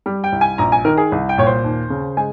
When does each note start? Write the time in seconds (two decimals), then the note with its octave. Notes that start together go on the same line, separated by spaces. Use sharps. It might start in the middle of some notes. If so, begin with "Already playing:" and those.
0.06 G3
0.24 G5
0.32 C2
0.41 G#5
0.58 A#1 A#5
0.72 G#5
0.85 D#3 A#4
0.97 G#4
1.12 C2
1.29 G5
1.38 A#2 C#5
1.46 C5
1.64 D#2
1.90 C#3
2.17 G#3 G#5